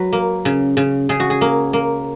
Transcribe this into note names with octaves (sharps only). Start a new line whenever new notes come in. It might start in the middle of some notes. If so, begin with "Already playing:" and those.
Already playing: F#3 B4
A#3
C#3
C#3
C#3 G#4
F#4
G#4
A#3
A#3